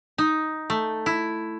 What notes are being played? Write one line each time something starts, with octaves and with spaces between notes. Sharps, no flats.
D#4
A3
E4